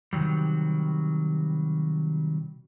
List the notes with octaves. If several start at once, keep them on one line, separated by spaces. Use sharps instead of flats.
C3 D#3 F#3 G3